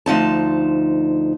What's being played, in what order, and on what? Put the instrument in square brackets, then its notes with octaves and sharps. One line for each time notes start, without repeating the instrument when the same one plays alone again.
[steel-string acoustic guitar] D2 F3 D#4 A5